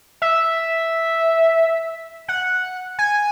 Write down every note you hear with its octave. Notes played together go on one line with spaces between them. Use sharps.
E5
F#5
G#5